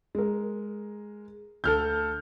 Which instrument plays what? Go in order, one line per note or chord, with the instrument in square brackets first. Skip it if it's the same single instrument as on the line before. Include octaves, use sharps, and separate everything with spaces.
[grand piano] G#3 A#4
[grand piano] D2 [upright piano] A4 F6 G6